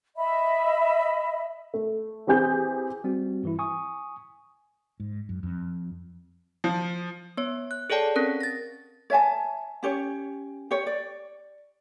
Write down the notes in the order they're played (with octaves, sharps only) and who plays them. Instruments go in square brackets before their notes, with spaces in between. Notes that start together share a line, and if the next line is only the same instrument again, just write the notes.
[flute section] D#5 E5 B5
[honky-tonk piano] A3
E3 C4 G4 G#4 G6
[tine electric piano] G3 C4 F#4
G2 E3 E4
G#5 C#6 D#6
[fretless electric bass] G#2
F#2
F2
[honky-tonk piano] F3
[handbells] B3 C#5
F#6
G#4 A4 C#5 D5 G5 A5
C4 C#4 A#4
A6 A#6
[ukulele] C#5 E5 G#5 A5
C#4 G4 C#5
G4 C#5
D5